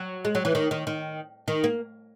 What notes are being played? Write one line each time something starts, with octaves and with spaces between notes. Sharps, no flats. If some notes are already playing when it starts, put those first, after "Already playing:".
Already playing: F#3
G#3
F#3
E3
D#3
D#3
D#3
D#3
A#3